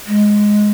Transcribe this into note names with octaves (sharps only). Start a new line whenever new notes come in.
G#3